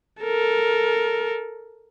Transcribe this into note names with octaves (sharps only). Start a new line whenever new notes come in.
A4 A#4